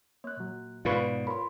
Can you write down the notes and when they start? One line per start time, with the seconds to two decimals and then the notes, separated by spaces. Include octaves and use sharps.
0.24 A#3 C#5 F#6
0.37 A#2 F#3
0.85 G#2 B2 F4 B4 D5 C#6
1.27 F4 A#4 C#5 B5 C6